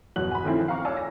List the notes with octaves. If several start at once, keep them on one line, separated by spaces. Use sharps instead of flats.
G1 E2 B2 F#3 F#6 F#7
G#5 B5
D#3 F3 A3 C4 C#4 E4
F5 A#5 C#6 D6
C#5 D5 G#5 A5 E6 F6
A#6